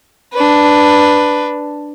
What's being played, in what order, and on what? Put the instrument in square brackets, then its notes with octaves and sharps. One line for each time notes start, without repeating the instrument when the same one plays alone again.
[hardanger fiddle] D4 B4